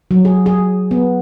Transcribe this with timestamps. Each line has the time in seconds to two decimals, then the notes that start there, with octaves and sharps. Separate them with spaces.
0.11 F#3
0.25 G#4
0.46 G#4
0.91 B3